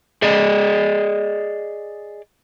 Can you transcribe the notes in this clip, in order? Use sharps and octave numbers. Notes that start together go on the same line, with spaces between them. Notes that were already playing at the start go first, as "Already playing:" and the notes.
G#4 D5 D#5